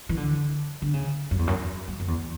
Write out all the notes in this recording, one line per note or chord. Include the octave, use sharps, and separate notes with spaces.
E3
D3
D3
C#3
F#2
E2
F#2
F#2
F#2
E2